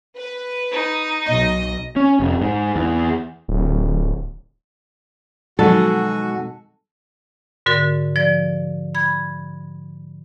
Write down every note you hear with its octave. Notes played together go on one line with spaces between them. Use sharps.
B4
D#4
B1 D#5
C#4
F1
G#2
E2
D1
B2 D#3 F3 F#3 G#3 D#4 F#4 A4
G#2 D3 F#4 A#4 A6
F3 D5 A6
B5 G#6